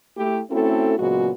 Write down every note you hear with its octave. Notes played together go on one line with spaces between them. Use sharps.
A3 E4 G4
A3 C4 C#4 E4 F#4 A4
A#2 C#3 F#3 G#3 B3 F#4